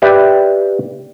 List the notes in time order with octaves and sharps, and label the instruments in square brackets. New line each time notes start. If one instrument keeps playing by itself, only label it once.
[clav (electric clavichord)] G4 B4 D5 E5